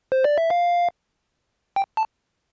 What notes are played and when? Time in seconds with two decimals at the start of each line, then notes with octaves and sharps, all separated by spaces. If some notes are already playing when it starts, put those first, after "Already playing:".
0.12 C5
0.24 D5
0.38 E5
0.50 F5
1.76 G5
1.97 A5